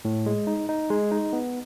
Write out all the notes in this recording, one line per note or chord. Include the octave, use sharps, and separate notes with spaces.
A2
G#3
D#4
D#4
G#3
D#4
B3